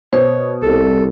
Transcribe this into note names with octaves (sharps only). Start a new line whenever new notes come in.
B2 C5 C#5
C2 A4